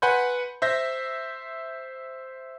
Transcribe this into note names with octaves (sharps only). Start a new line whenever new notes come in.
B4 F#5 G#5 B5 C6 G6
C5 E5 G6 A#6